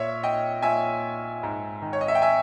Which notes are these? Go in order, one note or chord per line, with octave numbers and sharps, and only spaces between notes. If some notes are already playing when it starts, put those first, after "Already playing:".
Already playing: A#2 C#5 E5
D#5 G5
A#2 E5 G#5
G#2
D#3
C#5
D#5
E5
G5
E5 G#5